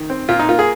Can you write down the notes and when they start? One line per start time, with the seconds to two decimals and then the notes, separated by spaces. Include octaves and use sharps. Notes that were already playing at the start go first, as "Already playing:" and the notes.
Already playing: D#3
0.10 C4
0.29 A#2 F4
0.39 D#4
0.49 A#3 F4
0.59 G#4